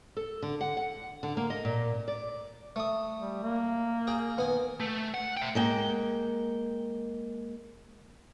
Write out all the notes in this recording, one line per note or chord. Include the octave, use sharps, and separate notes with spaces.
A4
D3
F#5
F#5
D3
A#3
D#5
A#2
D5
A3 D#6
G3
A#3
G#4 G5
D#3 B3 G#5
A3
F#5
E5 G5
G#3 A#3 G5